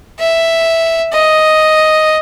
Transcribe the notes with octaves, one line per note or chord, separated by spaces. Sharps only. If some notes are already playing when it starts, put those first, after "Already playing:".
E5
D#5